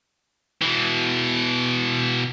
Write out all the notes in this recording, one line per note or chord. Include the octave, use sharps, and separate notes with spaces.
B2 E3